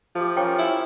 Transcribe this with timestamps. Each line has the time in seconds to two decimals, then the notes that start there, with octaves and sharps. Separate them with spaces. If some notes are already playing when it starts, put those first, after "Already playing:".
0.15 F3 A3 G4
0.37 C#4 F4 A#4 C#5 G5 D6
0.59 E4